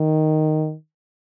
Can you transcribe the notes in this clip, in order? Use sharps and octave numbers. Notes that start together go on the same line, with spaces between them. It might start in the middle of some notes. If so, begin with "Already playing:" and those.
Already playing: D#3